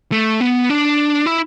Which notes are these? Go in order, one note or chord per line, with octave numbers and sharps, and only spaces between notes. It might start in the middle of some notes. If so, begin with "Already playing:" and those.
A3
B3
D4
E4